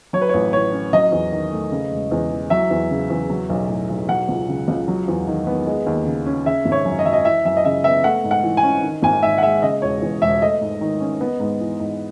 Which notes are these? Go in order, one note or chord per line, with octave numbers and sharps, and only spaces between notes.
F#3 C#5
B4
A1 C#5
A2 C#5
C#4
F#3 D#5
E2
D#3
A3
C#3
E1
E2
E3
F#3 E5
E2
C#3
E2
F#3
B1
A2
B1
F#3 F#5
C#2
C#3
C#2
F#3
E2
D#3
B3
G#3
D#2
C#3
C#4
C#3 E5
G#1
C#5
F#2
D#5
F#3 E5
D#5
E3 E5
F#2 E5
D#5
C#3 E5
B3 E5
A3 F#5
G#2
F#5
E3
G#5
C#4
D#3
G#1 G#5
G#2 E5
F#5
G#3 E5
C#3 D#5
E1 C#5
E2
E1 E5
A3 D#5
G#2
D#3
C#4
B3
G#2
E3
G#2